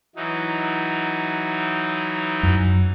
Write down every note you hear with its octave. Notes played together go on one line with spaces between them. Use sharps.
E3 F#3 D#4
F#2